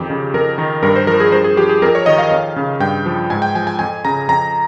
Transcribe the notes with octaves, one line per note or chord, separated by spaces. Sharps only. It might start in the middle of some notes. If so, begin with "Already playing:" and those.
Already playing: F2 D#3 G4
C#3
F2 A#4
D#3
G2 A#4
C5
F3 A#4
G#4
G2 C5
G#4
F3 G4
G#4
F2 A#4
C#5
D#3 D#5
F5
F2
C#3
G2 G5
F3
G#2 G#5
G5
F3 G#5
G#5
F2 G#5
C#3 A#5
F2 A#5